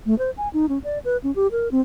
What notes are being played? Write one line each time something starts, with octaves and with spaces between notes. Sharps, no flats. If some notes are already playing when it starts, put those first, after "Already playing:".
A3
C5
G#5
D#4
C#4
D5
B4
C#4
G4
A#4
C4